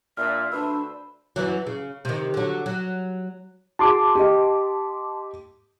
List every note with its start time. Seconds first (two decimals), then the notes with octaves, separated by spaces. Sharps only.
0.17 A#2 D4 E5 E6 F6
0.52 D2 D4 B4 C5 E5 E6
1.36 F#2 E3 F#3
1.67 C#3
2.05 C3 D#3
2.34 D3 F#3
2.66 F#3
3.79 F#4 G#4 A5 C6 D6
4.15 G4 D#5